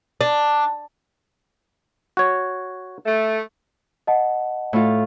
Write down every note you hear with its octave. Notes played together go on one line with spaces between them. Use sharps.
D4
F#4 C#5
A3
D#5 F#5 A5
A2 F4